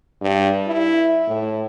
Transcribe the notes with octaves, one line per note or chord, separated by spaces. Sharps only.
G2
E4
A2